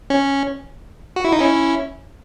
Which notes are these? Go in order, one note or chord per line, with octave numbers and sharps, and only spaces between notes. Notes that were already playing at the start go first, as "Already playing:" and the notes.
C#4
F#4
E4
D#4
C#4 E4